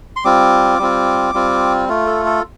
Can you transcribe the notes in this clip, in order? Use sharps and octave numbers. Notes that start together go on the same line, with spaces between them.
C6
G3 C4 F4 D6
G3 C4 F4
G3 C4 F4
A3 F4
A4
A4